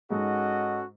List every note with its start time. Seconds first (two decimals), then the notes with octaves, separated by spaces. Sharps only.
0.10 G#2 G#3 C#4 F#4 A4 D#5 F#5